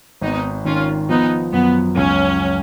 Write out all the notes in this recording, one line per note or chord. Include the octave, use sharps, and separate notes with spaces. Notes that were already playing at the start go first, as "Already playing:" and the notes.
G#1 B3 D#4
D#3 C#4 F4
F3 B3 D#4
F#2 B3
C#2 C#4